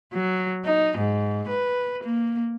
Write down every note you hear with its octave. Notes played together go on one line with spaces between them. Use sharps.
F#3
D#4
G#2
B4
A#3